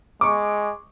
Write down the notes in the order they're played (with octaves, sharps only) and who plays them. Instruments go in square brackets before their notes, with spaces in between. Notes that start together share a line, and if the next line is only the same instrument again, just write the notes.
[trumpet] G#3 [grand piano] C#6 D6